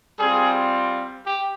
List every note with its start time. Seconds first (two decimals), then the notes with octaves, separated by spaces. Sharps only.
0.19 G3 C4 F4 G#4
1.26 G4